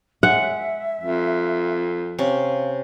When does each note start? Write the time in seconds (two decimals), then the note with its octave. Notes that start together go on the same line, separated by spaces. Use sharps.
0.23 G#3 E5 F#5
1.01 F2
2.19 C3 C#4 F5